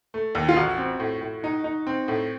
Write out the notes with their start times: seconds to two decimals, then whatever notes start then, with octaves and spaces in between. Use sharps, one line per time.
0.14 A3
0.35 D#2
0.49 F4
0.57 A1 F#4
0.78 C4
1.00 A2
1.21 A2
1.44 D#4
1.64 D#4
1.87 C4
2.08 A2